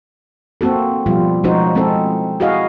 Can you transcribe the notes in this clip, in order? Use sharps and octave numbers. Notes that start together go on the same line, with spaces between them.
A#3 C4 F#4 A4
B2 F3 G3 F4
F3 G#3 C#4 D#4 F#4 C5
G#3 C4 E4 A4
E4 F#4 G#4 D#5 F5